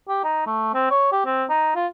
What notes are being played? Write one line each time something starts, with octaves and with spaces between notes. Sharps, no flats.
G4
D#4
A3
C4
C#5
G4
C4
D#4
F4